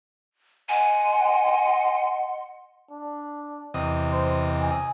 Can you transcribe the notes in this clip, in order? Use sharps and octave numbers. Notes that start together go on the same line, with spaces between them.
D#5 F#5 G#5 C6
D4
E2 C3 D#5
C5
G#5